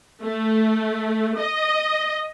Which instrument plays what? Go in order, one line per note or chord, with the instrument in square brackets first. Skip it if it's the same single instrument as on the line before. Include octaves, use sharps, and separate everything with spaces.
[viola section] A3
D#5